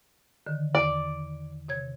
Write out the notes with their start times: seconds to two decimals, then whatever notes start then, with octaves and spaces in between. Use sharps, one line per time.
0.47 D3 D#3
0.75 E2 D5
1.69 C3 C#5 G#6